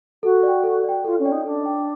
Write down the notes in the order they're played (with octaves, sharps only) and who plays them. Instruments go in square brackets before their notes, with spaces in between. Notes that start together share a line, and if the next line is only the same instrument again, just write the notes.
[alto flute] F#4 [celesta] A4
[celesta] D5 G5
A4
D5 G5
[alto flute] F4 [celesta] A4
[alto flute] C#4
[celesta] D5 G5
[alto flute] D#4
[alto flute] D4 [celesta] A4
[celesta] D5 G5